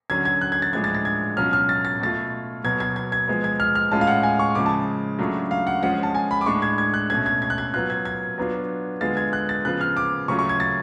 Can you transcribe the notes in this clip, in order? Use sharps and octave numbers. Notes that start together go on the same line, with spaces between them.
D3 F#3 C#4 G#6
G#6
F#6
G#6
A6
A2 F3 G#3 D4 G#6
A6
A6
G#6
B2 F#3 C#4 F4 F6
F6
A6
A6
B2 A3 F4 A6
B2 F#3 B3 G#6
G#6
G#6
G#6
F3 G#3 B3
G#6
F6
F6
A2 G#3 C#4 F4 A5
F5
F#5
G#5
C#6
C#3 F3 G#3 D6
A5
C#3 F#3 A3 D4 F4
F5
F#5
F3 G#3 C#4 F4 F#5
A5
G#5
B5
D6
A2 G#3 D4 C#6
G#6
G#6
F#6
B2 A3 C#4 G#6
G#6
G#6
F#6
G#6
F#3 B3 F4 F#6
G#6
G#6
F#3 B3 D4 F4
D3 G#3 B3 F4 A6
G#6
F#6
A6
C#3 F3 B3 F4 F#6
F6
D6
C#3 F#3 A3 C#4 F4 C#6
C#6
G#6
A6